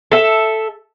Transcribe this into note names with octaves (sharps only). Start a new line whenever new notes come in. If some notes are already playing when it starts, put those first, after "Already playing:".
A4 E5